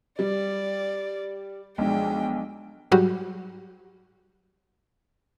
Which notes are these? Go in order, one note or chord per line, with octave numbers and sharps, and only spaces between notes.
G3 D5
B1 F3 G#3 D4 G5
G#2 F#3 G3 F#4 G4